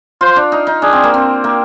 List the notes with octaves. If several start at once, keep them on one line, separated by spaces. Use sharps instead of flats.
F4 C5
D4
D#4
D#4
D4 G#4
C4
A#3
C4
A#3